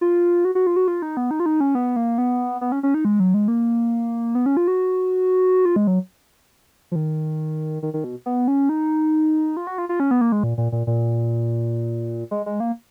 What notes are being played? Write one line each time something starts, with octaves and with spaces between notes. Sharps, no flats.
F4
F#4
F#4
F4
F#4
F4
D#4
B3
D#4
F4
D#4
C#4
B3
A#3
B3
B3
C#4
C#4
D#4
G#3
F#3
G#3
A#3
B3
C#4
F4
F#4
F4
G#3
F#3
F3
D#3
D#3
D#3
B2
B3
C#4
D#4
F4
F#4
F4
F4
C#4
B3
A#3
G#3
A#2
A#2
A#2
A#2
G#3
G#3
A#3